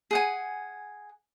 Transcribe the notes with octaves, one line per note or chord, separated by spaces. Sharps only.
G#4 F#5 G#5